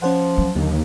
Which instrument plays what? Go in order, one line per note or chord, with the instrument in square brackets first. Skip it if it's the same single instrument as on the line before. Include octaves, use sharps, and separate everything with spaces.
[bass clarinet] F3 [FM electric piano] C#4 C5 F#5
[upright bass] F#3
[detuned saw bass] D#2 [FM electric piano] D3